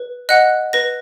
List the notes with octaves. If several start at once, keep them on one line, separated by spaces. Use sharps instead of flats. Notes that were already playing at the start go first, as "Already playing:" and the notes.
Already playing: B4
D#5 F#5 F#6
B4 A#6